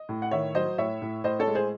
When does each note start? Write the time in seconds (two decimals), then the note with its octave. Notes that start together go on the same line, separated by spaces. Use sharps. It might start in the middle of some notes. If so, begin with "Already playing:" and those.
Already playing: D#5
0.09 A2
0.22 F#5
0.31 D#3 C#5 E5
0.55 F#3 C5 D#5
0.78 A2 C#5 E5
1.02 A2
1.24 A2 C5 D#5
1.39 A4 C#5
1.48 G#3
1.55 G#4 C5